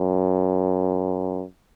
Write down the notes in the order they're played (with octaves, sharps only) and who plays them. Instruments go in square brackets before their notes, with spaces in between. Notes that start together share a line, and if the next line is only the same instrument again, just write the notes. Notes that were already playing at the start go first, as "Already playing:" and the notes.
Already playing: [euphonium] F#2